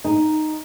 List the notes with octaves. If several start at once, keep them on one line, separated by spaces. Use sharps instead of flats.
D#4